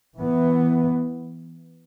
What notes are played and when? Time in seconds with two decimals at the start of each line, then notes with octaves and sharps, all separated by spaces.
0.17 E3 B3